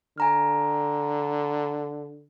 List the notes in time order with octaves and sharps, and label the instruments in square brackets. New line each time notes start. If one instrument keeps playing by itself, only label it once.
[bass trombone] D3 [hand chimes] G#5 A#5 F6